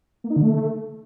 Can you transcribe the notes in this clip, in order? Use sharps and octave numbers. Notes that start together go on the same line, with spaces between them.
A#3
D#4
D3
A3